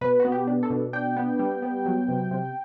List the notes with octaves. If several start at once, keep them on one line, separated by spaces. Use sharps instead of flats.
B2 B4
B3 F#4
G4
D4
A4
B2
D4 G5
B3
G3
B3
F#3
C3
C3